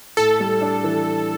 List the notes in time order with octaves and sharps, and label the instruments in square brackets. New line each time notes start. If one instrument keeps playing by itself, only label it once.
[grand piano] A2 [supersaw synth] A4
[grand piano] G3
D4
E3